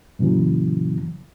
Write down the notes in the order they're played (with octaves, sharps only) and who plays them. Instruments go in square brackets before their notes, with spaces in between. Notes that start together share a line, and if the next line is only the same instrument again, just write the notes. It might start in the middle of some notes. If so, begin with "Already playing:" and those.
[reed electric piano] F#2 A#2 C#3 E3 F#3